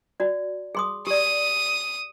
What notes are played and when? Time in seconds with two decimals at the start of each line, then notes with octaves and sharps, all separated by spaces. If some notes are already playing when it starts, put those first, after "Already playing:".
0.20 F#4 D5
0.75 G#4 C6 D#6
1.07 G4 D5 D#6